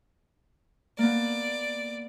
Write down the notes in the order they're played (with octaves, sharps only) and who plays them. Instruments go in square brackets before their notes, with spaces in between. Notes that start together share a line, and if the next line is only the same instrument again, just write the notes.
[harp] A#3 B3 [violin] D5